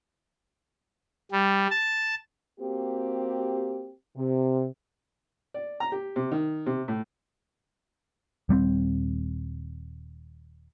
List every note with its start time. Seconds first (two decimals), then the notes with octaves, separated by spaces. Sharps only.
1.32 G3
1.70 A5
2.60 A#3 C4 F#4 G4
4.17 C3
5.54 D5
5.80 A#5
5.92 G4
6.16 C3
6.32 D#3
6.66 C3
6.88 A2
8.49 D#1 G3 A#3 C4